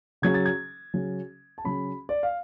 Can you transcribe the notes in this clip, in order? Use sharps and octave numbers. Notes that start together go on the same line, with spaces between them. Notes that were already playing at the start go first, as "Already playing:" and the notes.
C#3 F#3 C#4 G#6
A6
G#6
C#3 F#3 C#4
A5
C#3 F#3 C#4 B5
D5
F5